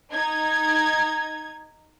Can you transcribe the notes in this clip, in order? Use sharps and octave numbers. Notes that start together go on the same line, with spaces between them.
D#4 G#6